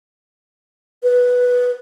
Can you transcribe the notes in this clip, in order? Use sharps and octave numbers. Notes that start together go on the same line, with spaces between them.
B4